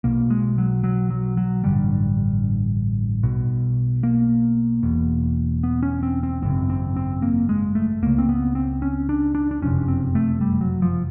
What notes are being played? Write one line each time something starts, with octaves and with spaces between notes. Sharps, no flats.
B1 B2 A#3
G#3
F#3
F#3
F#3
F#3
A1 G2 D3 G3
B1 B2
A#3
E1 E2 B2
B3
C#4
C4
C4
G#1 F#2 C#3 C4
C4
C4
A#3
G#3
A3
C#2 C#3 A#3
C4
B3
C4
C#4
D4
D4
D4
F#1 F2 C3 C#4
C4
A3
G3
F#3
F3